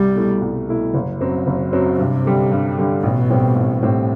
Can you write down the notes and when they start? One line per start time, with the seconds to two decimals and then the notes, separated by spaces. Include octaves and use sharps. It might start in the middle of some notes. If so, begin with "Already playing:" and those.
Already playing: C2 G3
0.15 B2 A3 E4
0.42 C2
0.68 B2 A3 E4
0.94 F#1
1.20 F#2 F#3 C4
1.47 F#1
1.73 F#2 F#3 C4
1.99 G2 C3
2.25 D3 G3
2.52 G2
2.78 D3 G3
3.03 A1 B2
3.30 A2 G3 C4 G4
3.56 A1
3.82 A2 G3 C4 G4